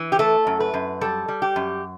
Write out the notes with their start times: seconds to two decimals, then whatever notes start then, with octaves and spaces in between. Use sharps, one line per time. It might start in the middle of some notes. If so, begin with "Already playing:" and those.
Already playing: E3
0.12 G4
0.19 A3 A4
0.47 F#2
0.60 B4
0.74 F#2
1.01 G3 A4
1.28 G3
1.42 G4
1.56 F#2